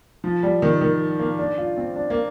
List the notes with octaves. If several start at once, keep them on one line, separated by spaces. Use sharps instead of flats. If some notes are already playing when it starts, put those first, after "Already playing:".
F3
G3
D#3
D#3
A#3
D4
F4
C4
D4
A#3